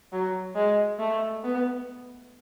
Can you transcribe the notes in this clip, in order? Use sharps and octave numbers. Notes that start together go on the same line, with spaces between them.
F#3
G#3
A3
B3